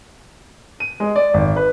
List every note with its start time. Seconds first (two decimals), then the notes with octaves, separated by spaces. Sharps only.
0.80 D#7
1.00 G#3
1.16 D5
1.34 G#1
1.56 B4